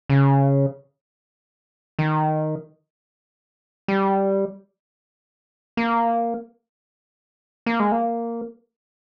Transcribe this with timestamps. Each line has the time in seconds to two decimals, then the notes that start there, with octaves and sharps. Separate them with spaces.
0.10 C#3
1.99 D#3
3.88 G3
5.77 A#3
7.66 A#3
7.80 G#3
7.92 A#3